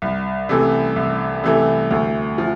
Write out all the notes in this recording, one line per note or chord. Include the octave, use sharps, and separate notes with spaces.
C2
C3 E3 A3
C2
C3 E3 A3
D2
F3